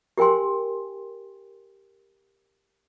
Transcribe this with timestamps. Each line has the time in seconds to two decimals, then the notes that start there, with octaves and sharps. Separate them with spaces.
0.18 G4 A#4 G5 G#5 C6